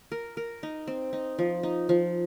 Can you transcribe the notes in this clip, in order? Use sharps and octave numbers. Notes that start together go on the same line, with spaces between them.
A#4
A#4
D#4
C4
D#4
F3
D#4
F3